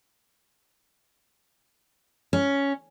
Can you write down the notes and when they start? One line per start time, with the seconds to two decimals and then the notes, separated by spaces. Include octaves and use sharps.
2.33 C#4